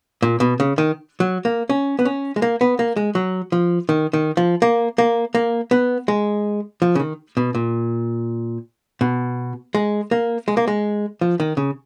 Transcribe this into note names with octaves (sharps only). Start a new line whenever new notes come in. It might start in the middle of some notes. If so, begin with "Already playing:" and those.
A#2
B2
C#3
D#3
F#3
A#3
C#4
B3
C#4
G#3
A#3
B3
A#3
G#3
F#3
F3
D#3
D#3
F3
A#3
A#3
A#3
B3
G#3
F3
C#3
D#3
B2
A#2
B2
G#3
A#3
G#3
A#3
G#3
F3
D#3
C#3